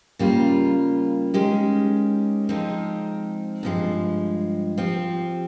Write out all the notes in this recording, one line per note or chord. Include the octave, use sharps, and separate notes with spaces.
C#3 G3 A#3 F4
D#3 G#3 C#4 G4
F3 G#3 C4 D#4
G2 F3 G#3
F3 C4 G4